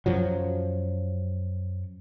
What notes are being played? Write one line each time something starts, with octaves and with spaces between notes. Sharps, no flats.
F#2 F3 F#3